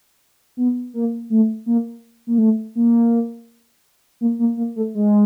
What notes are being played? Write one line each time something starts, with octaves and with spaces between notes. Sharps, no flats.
B3
A#3
A3
A#3
A#3
A3
A#3
A#3
A#3
A#3
A3
G#3